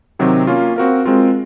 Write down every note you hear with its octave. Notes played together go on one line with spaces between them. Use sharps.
C3 D#3 F#3 C4
A#3 C#4 F4
C4 F#4 A#4 F5
G#3 C4 F4 A#4